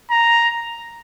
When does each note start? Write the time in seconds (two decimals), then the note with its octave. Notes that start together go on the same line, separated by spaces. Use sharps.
0.10 A#5